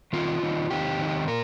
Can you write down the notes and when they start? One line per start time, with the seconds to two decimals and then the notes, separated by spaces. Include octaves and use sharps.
0.13 D#3 C4 D#4 F4
0.42 D#3 C4 D#4
0.70 D#3 C4 D#4 G4
0.99 D#3 C4 D#4
1.28 A#2 A#4